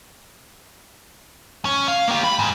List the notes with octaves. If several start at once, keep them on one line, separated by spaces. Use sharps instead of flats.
C#4
F5
A#3 G4
B5
G#2